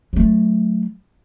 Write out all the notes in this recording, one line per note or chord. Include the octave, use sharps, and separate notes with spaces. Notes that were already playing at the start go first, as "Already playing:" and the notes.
F#3 A3